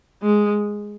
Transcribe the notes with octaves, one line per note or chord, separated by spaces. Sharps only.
G#3